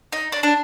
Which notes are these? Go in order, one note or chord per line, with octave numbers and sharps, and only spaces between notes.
D#4
D4
D4